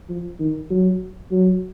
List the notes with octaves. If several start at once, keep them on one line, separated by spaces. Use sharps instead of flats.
F3
D#3
F#3
F#3